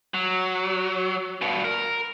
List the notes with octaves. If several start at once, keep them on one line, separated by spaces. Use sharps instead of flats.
F#3
G2 B2
A#4